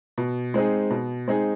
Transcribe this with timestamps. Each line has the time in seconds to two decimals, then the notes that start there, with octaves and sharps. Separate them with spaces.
0.18 B2
0.54 G#3 C4 D#4 G#4
0.90 B2
1.28 G#3 C4 D#4 G#4